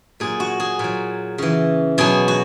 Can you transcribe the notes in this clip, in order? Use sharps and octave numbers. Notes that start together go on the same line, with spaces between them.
A#2 F#3 G#4
F#4
G#4
A#2 F#3
C#3 E3
B2 F#3 G#4
F#4